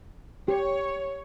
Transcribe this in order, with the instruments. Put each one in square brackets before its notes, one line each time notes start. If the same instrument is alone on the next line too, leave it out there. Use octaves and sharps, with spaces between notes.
[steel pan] G4 [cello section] C#5